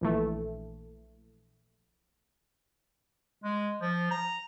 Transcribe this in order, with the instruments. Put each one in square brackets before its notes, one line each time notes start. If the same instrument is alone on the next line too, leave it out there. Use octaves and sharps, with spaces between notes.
[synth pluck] A#1 E3 A3
[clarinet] G#3
F3
A#5